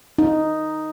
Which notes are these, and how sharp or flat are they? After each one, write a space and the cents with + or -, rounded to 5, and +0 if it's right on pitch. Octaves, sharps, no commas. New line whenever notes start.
D#4 +0